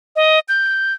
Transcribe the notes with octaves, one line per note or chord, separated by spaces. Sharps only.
D#5
G6